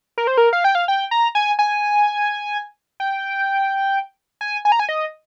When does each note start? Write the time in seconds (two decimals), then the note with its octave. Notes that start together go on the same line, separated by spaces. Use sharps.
0.18 A#4
0.27 C5
0.38 A#4
0.53 F5
0.64 G5
0.75 F5
0.88 G5
1.11 A#5
1.35 G#5
1.59 G#5
3.00 G5
4.41 G#5
4.65 G#5
4.72 A#5
4.80 G#5
4.89 D#5